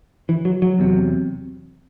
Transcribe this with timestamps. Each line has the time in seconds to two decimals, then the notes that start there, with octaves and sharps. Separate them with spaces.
0.29 E3
0.45 F#3
0.62 F#3
0.79 E2 C3